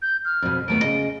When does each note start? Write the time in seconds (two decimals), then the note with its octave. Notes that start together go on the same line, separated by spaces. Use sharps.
0.02 G6
0.25 F6
0.42 F2 B2
0.68 D#2 A3 B3 D7
0.81 C#3 D#5